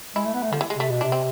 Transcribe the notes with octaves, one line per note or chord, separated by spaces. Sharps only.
G#3 E4
A3
B3
A3
D3 F3
E3
G#3
C3 A3
B2
C3 D4
C4